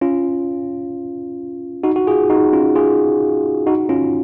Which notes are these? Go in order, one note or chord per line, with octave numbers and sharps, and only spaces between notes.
C#4 F4
D#4 F#4
F#4
F4 G#4
D#4 F#4
C#4 F4
F4 G#4
D#4 F#4
C#4 F4